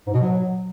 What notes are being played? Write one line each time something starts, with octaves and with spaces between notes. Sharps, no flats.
G#2
B2
F#3